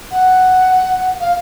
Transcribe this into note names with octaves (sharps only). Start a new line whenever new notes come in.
F#5
F5